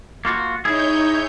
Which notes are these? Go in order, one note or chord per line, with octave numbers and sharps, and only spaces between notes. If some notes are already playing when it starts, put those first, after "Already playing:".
A#3 F4 F#4
D#4 E4 G#4 C#5 G6